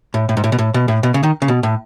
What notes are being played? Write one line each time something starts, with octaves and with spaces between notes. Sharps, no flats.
A2
A2
G#2
A2
B2
A2
B2
A2
B2
C#3
D#3
C#3
B2
A2